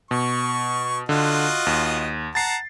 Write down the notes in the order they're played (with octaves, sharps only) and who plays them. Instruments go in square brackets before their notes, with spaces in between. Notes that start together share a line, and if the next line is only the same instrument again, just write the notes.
[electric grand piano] B2 [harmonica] C#6
[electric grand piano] D3 [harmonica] F4 F#4 D#5
[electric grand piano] D#2
[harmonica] F#5 A5 A#5 [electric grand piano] A6 C7